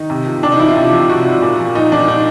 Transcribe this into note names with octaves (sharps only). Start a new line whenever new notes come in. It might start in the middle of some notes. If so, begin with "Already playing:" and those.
Already playing: D#3 D#4
C3
F3
C3 D4
D#4
F3 E4
F4
C3
F3
C3 F#4
F3
A#2
F3
A#2 D#4
F3 D4
A#2 D#4